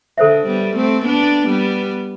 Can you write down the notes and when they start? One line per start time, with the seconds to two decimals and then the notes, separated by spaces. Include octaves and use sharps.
0.18 D3 A4 C5 E5
0.46 G3 B3
0.76 A3 C4
1.05 B3 D4
1.47 G3 B3